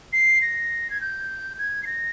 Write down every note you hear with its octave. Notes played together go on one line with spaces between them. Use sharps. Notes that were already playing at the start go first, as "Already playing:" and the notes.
C7
A#6
G#6
G6
G#6
C7
A#6